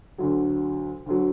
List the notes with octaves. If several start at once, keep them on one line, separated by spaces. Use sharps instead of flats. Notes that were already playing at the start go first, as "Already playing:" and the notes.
D2 D3 F#3
D2 D3 F#3